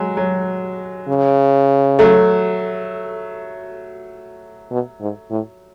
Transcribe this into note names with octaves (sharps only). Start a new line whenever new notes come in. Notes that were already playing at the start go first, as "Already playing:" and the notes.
Already playing: F#3 G#3
F#3
C#3
F#3 A3
B2
G#2
A2